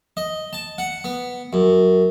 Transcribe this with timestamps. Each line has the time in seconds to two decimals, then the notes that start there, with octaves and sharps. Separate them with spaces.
0.17 D#5
0.53 A5
0.78 F#5
1.04 B3
1.53 F#2